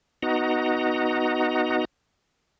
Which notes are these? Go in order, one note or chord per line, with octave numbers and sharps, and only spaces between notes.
B3 D#4 F#4 D#5 F#5 A#5